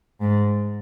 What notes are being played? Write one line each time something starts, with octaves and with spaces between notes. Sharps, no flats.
G#2